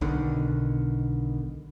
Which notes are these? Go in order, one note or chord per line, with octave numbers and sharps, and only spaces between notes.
B1 B2 D3 D#3